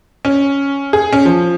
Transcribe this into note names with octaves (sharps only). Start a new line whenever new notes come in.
C#4
G#4
C#4
F3